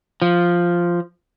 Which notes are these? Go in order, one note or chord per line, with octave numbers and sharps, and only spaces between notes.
F3